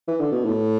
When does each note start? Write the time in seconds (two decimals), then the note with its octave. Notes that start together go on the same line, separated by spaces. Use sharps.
0.08 E3
0.20 D3
0.32 B2
0.45 A2